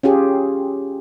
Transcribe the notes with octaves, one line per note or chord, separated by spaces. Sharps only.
C#4 F4 G4 G#4